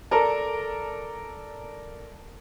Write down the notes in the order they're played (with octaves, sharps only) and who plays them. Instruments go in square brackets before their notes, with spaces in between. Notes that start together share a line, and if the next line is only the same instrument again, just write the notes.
[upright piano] A4 A#4 D5 A5 A#5